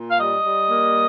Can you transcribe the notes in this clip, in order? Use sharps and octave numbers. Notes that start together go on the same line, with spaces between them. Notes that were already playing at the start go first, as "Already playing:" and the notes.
Already playing: A#2
F5
G3 D#5
G3
A#3